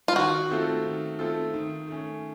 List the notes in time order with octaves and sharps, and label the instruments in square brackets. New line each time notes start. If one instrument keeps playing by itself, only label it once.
[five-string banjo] F4
[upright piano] D#3 [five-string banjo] F#4
[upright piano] A3 C4 F4 A4
D#3
A3 C4 F4 A4
D#3
A3 C#4